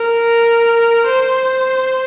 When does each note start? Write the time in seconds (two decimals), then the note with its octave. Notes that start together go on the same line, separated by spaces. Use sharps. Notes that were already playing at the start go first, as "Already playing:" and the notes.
Already playing: A#4
1.06 C5